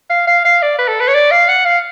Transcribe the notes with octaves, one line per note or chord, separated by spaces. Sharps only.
F5
F5
F5
D5
B4
A4
B4
C#5
D5
F5
F#5
F5